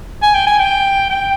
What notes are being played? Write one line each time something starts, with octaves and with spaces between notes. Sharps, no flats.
G#5
G5
G#5
G5
G5